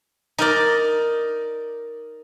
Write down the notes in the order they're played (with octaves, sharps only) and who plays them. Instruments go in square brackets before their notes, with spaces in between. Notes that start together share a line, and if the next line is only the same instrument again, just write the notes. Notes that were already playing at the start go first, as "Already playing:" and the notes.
[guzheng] D#4 A#4 D5